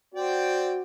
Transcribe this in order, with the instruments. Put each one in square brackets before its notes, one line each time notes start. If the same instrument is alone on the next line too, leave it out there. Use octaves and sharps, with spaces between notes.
[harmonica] C4 D5 G5 [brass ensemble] F#4